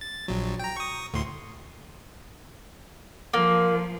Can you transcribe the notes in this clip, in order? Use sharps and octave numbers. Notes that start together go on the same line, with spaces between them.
A6
A#1 F#3
G5 A#5
C#6 D#6
D2 A2 C6
F3 A#3